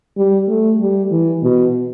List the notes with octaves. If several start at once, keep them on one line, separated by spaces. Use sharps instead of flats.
G3
A3
G3
E3
B2